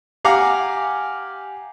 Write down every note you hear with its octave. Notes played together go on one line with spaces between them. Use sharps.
G4 F5 F#5 G#5 A#5 D6